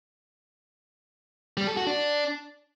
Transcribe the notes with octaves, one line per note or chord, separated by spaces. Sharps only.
G3
A4
F#4
D4